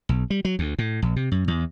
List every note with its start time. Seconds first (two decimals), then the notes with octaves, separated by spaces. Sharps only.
0.09 B1
0.30 G3
0.45 F#3
0.59 D2
0.79 A2
1.02 A#1
1.16 C3
1.32 F#2
1.48 E2